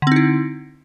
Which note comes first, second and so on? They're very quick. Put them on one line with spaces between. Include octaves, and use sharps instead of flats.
D3 C4 D#4 E4